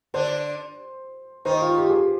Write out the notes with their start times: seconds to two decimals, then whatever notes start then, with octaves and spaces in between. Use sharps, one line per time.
0.14 D3 D4 C5
1.45 D#3 D#4 C5
1.62 F4
1.78 G4
1.90 G#4
1.95 G4